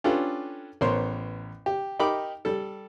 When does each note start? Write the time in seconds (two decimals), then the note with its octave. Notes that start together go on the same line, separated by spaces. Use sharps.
0.04 C#4 D4 F4 G4 A4 B4
0.81 A1 B3 A#4 C5 C#5 C6
1.66 G4
1.99 D#4 G4 A#4 B5 D6
2.45 G3 A4